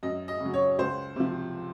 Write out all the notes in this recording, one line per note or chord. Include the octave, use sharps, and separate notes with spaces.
F#2 D#5
D#5
C#3 F#3
C#5
C#2 C5
C3 F3